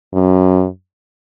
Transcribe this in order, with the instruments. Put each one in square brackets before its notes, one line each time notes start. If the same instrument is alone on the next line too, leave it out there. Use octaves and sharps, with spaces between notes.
[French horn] F#2